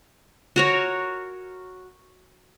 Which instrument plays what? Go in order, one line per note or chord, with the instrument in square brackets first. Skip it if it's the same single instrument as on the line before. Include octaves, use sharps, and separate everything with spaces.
[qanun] F#4 A#4 C#5